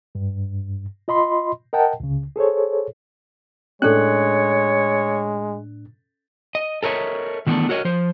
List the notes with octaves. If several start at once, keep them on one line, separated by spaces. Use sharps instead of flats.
G2
F4 D#5 B5 C6
A#4 D#5 F#5 G5 A5
C#2 C#3
G#4 A4 C5 C#5
A2 G#3 C#4 D4 A4 C#5 F#6
D#5
A4 A#4 C#5 D#5 E5
D#3 E3 A3 B3 D4
F#4 A#4 C#5 D#5
F3 C5